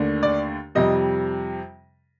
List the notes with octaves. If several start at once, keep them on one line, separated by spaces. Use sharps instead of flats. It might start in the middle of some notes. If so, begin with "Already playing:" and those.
Already playing: D#2 D3 A3 D4
D5
F2 C3 G3 D#5